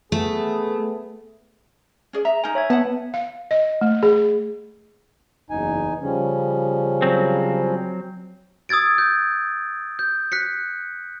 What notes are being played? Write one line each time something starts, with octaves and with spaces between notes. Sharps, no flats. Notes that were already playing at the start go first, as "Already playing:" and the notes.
A3 B3 G#4 A4
C#4 G#4 D5
E5 A#5
D#4 A#4 G#5
C#5 E5 G#6
B3 F#5 A5
F5
D#5
A3
G#4
F#1 E2 D#4 G#5
C#3 F3 G3 C#4
F#3 C4
D#6 E6 G#6 A6 D7
G6
G6
F#6 B6 C#7